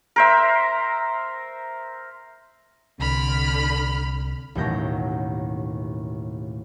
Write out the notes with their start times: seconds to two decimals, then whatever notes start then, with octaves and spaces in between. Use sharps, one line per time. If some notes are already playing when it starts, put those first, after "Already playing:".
0.16 A#4 C5 E5
3.00 C2 D3 B5 F6
4.55 A1 D#2 B2 F#3 G6 A#6